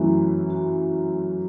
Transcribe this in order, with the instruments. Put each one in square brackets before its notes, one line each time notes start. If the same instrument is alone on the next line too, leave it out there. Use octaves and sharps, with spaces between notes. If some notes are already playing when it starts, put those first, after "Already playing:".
Already playing: [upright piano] F#2 E3 A3 C#4 E4 [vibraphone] F#4
[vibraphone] F#4